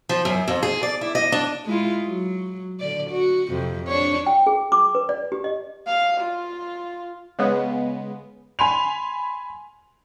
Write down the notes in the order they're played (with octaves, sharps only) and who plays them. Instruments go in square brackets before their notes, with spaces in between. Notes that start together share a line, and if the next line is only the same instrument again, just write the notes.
[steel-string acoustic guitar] F3
F#2
F2
G#4
D5
E4
D#5
D4
[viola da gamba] G#3 E4 F4
F#3
D3 D5
F#4
F2 C3
D4 C#5
[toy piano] G5
G#4
D6
B4
D5
G4
D#5
[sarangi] F5
F4
[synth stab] C#3 G#3 B3
[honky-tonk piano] G#5 B5 C6 F7